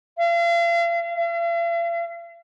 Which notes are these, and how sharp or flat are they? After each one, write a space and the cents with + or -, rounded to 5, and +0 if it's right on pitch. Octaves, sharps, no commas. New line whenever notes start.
F5 -40
F5 -45